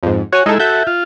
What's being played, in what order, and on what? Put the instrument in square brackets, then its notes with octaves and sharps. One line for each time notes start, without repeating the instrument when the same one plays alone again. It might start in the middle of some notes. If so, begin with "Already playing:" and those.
[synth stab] F2 G#2
[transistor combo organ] F#4 [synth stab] C#5 G#5
[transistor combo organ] G#3 E4 [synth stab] D#4 A4
[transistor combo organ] F#4 A4 [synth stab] E5 G6
[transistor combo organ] F4